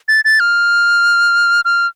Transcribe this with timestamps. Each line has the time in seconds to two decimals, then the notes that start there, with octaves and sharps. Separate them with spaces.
0.08 A6
0.25 A6
0.40 F6
1.65 F6